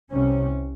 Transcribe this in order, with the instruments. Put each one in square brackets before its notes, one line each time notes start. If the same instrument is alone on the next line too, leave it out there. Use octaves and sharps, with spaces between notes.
[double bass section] C2 C3 C#4